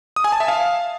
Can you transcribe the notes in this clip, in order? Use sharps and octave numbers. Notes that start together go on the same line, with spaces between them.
D#6
G#5
A5
E5
F5